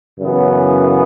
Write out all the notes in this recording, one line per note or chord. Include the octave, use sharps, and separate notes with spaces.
F#2 C#3 E3 B3